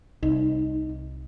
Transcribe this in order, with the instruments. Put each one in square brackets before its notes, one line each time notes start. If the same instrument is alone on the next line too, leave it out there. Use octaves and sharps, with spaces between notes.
[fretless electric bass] C2 [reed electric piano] D#4